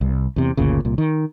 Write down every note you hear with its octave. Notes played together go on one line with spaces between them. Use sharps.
C2
E2 C3
G1 D2 A#2 C#3
C2 A#2
D#3